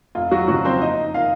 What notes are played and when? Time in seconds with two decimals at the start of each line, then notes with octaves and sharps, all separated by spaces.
0.15 F1 F4
0.31 F#3 F#4
0.48 F2 C#3 F3 F#3 F#4
0.65 C4 C5
0.81 F#1 D#4 D#5
1.14 D#3 A#3 F4 F5